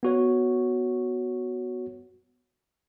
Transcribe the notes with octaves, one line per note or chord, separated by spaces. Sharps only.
B3 F#4 C#5